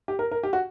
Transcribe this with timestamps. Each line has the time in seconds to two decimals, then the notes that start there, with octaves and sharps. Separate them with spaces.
0.08 G4
0.19 A#4
0.32 A#4
0.43 G4
0.53 F#4